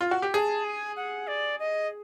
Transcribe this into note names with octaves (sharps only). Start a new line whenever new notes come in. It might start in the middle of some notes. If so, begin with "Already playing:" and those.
F4
F#4
G4
G#4 A5
G#5
F#5
D5
D#5